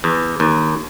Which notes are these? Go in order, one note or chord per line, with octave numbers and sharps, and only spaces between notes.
E2
D#2